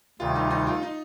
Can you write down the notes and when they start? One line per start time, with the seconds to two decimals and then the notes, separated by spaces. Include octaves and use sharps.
0.19 D2 C3 D#3 G3 F4
0.35 D#4
0.51 D#4
0.67 F4
0.83 D#4